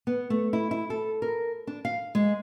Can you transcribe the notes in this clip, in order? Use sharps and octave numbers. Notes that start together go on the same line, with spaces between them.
B3
A3
E4
E4
A4
A#4
D4
F5
G#3